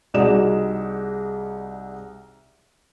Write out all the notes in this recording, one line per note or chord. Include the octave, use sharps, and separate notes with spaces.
C2 D#4 F#4 G#4 D5 E7